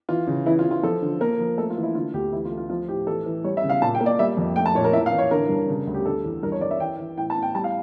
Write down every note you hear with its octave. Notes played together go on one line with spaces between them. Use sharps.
E3 F4
C#3
E3 E4
F4
E3
F4
F3 A4
D3
A#3 A#4
F3
A3 A4
F4
E3
E4
D3 F4
D2 G4
E3 E4
F4
A3
F4
F3 F4
A2 G4
E3 A4
E3
G3 C#5
E5
C#3
F5
A#2 A5
G5
A#3
D5
G3 E5
F2
A3 G5
A5
A#2 C#5
A#4
A2 E5
F5
E3
C#5
D3 A#4
G2
C#3
D2
G4
D3 A4
E2
G2 A#4
C#5
G2 D5
E5
E3 G5
E3
A2 G5
A5
A2
G5
G3 A5
F5